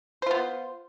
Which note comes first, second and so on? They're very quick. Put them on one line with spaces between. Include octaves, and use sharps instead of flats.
C5 F4 B3